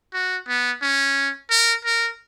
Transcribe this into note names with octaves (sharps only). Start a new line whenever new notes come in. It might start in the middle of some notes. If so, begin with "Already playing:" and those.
F#4
B3
C#4
A#4
A#4